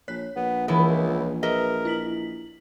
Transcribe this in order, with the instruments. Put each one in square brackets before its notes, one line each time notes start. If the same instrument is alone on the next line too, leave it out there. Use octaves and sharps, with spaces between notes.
[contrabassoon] A#1 [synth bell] C#5 F#6 B6
[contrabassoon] A#1 [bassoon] B3
[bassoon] C#2 [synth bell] E3 A#4 [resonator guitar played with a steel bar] G#3 B3 E4
[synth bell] G#4 B4 [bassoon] A#4 [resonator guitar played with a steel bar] D#5 E5
[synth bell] E4 B6 F#7